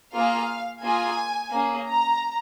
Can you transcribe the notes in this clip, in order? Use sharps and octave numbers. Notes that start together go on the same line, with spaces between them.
A#3 F4 G#4 F5
A#3 F4 G#4 G#5
A#3 C#4 G#4
A#5